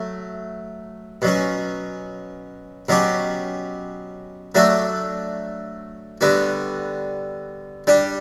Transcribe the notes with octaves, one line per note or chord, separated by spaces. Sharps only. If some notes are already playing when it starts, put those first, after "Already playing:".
Already playing: F#3 A3
B2 F#3 C#4
B2 F#3 C#4 G4
F#3 A3 D4 F#4 A4
D3 G3 B3 F#4
G3 D4 G4